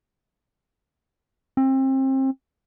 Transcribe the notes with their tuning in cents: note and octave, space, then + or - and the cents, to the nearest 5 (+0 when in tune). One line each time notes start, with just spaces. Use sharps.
C4 +30